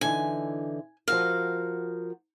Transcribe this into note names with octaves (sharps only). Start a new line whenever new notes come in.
D3 E3 D#4 G#5
F3 F#4 A#4 F5